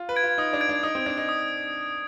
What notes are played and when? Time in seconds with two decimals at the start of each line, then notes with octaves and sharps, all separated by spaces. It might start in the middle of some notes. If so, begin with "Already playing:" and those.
Already playing: F4
0.09 B4
0.16 G#6 D7
0.23 F4
0.38 D#4 D#6
0.53 D4
0.61 G#6 D7
0.69 D4
0.83 D#4 D#6
0.95 C4
1.06 D4 G#6
1.10 D7
1.17 D#4
1.29 D#6